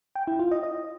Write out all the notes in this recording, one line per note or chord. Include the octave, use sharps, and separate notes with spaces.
G5
E4
F4
D#5
D#5